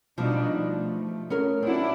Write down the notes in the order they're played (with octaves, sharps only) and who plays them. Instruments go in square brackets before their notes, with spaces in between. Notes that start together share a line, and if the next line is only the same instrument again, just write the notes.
[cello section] B2 D4 D#4 [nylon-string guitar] F3 G3
[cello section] A3
[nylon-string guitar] C#4 G#4 A#4
[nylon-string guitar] C4 F#4 [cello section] D4 E4